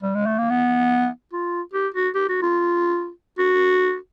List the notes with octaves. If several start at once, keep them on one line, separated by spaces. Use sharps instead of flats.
G3
G#3
A3
A#3
B3
F4
G4
F#4
G4
F#4
F4
F#4